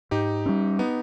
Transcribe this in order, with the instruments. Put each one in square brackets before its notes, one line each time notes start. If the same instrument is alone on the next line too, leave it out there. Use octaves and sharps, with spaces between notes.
[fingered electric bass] G#2 [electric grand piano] D#4 G4
[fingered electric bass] G3 A#3 C#4
[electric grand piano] B3 D#4